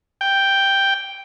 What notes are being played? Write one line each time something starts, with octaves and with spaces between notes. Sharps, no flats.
G5